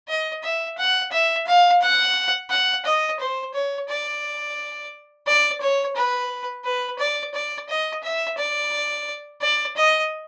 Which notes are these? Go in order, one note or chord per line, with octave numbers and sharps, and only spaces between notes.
D#5
E5
F#5
E5
F5
F#5
F#5
D#5
C5
C#5
D5
D5
C#5
B4
B4
D5
D5
D#5
E5
D5
D5
D#5